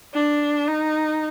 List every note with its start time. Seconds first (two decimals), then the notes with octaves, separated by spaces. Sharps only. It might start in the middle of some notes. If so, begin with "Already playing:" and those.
0.14 D4
0.67 D#4